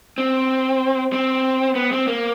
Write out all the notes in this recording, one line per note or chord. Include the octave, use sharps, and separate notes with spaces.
C4
C4
B3
C4
A#3